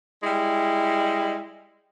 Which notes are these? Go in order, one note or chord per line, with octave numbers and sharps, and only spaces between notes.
G3 G#3 E4